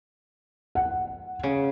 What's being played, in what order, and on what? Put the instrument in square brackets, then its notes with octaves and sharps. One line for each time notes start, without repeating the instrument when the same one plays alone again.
[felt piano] F#5
[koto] C#3